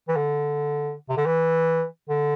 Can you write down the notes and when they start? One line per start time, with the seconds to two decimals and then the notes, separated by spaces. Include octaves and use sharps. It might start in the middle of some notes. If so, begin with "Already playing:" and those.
0.09 E3
0.16 D3
1.09 C3
1.17 D3
1.26 E3
2.09 D3